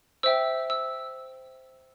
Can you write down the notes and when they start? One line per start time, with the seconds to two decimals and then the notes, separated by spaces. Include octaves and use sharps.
0.23 C5 E5 G5 E6
0.70 E6